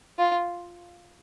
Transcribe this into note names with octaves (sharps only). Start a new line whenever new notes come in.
F4